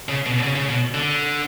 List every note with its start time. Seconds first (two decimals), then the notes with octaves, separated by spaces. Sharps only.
0.09 C#3
0.26 B2
0.43 C#3
0.56 C#3
0.69 B2
0.94 D3